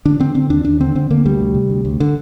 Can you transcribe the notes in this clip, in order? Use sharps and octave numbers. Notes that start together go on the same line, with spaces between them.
D3 D4
D3 C4
D3 C4
D#2 D4
D#2 D4
D3 C4
D3 C4
D3 A#3
D2 G3
C3
C3
D2
D2
D3